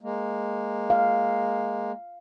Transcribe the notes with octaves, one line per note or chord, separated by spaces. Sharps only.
G#3 A#3
F5